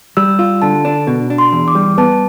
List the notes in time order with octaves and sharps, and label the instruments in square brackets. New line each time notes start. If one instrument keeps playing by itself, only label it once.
[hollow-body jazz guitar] G3 [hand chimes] E6
[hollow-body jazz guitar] F4
[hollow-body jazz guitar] D3 [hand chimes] A5
[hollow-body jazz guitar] D4
B2
D4
[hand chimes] C6
[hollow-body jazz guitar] E2
[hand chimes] D6
[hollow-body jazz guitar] G3
[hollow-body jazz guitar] B3 [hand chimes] A5